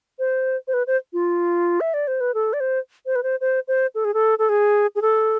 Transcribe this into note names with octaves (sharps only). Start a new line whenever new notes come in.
C5
C5
B4
C5
F4
E5
D5
C5
B4
A4
D5
C5
C5
B4
C5
C5
C5
A4
G#4
A4
A4
G#4
G#4
A4